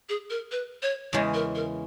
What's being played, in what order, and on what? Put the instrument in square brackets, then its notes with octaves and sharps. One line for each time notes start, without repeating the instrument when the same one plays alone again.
[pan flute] G#4
A#4
B4
C#5
[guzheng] E2 C#3 E3 G#3 C#4 [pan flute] C#5
[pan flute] A#4
A#4